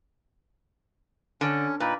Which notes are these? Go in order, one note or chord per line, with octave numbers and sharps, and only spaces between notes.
D3 C#4
A#2 D#4 B4